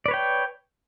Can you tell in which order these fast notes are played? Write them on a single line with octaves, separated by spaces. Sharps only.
D5 B4 C#5 G5